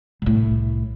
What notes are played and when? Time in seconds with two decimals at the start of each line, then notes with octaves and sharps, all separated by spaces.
0.22 C2 A2